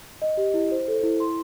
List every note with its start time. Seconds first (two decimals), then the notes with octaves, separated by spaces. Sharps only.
0.22 D#5
0.37 G4
0.54 E4
0.71 C5
0.88 A4
1.03 E4
1.20 C6